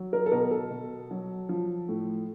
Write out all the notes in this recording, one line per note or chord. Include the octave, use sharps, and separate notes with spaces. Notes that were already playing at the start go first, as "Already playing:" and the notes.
Already playing: F#3
A#4
A4
B2 A#4
A4
B2
F#3
F3
A2